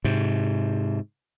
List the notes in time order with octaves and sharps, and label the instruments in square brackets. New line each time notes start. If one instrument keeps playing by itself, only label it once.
[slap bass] G#2 C3